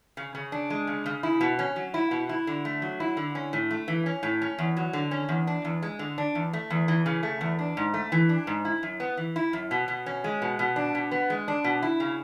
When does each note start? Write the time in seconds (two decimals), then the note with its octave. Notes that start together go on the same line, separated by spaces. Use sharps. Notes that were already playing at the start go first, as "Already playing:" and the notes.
0.17 C#3
0.35 C#3
0.52 D4
0.70 G#3
0.87 C#3
1.06 C#3
1.23 E4
1.41 B2
1.59 C#4
1.76 F#3
1.94 E4
2.11 B2
2.29 E4
2.47 D3
2.65 A3
2.82 F#3
3.00 E4
3.17 D3
3.35 C#4
3.53 A2
3.71 A3
3.88 E3
4.06 C#4
4.23 A2
4.42 C#4
4.59 E2
4.77 F#3
4.93 D3
5.11 C#4
5.29 E2
5.47 D4
5.65 E2
5.83 G#3
5.99 D3
6.18 D4
6.35 E2
6.53 A3
6.70 E2
6.88 E3
7.06 C#3
7.23 A3
7.41 E2
7.59 D4
7.77 G#2
7.94 A3
8.12 E3
8.29 D4
8.47 G#2
8.65 E4
8.83 F#2
9.00 B3
9.17 E3
9.36 E4
9.53 F#2
9.71 B2
9.88 B2
10.06 C#4
10.24 G#3
10.42 B2
10.59 B2
10.76 D4
10.95 B2
11.11 B3
11.30 G#3
11.48 D4
11.64 B2
11.83 E4
12.00 C#3